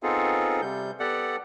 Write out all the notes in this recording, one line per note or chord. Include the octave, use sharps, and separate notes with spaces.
B3 C4 D#4 F4 G#4 A4
C3 G3 G6
B3 G4 A4 D5 F#5